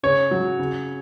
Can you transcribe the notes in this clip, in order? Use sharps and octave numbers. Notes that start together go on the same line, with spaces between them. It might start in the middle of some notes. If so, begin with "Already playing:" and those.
C#3 C#5
F#3
C#3